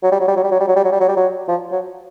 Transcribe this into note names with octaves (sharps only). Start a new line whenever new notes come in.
F#3
G3
F#3
G3
F#3
G3
F#3
G3
F#3
G3
F#3
G3
F#3
G3
F#3
F3
F#3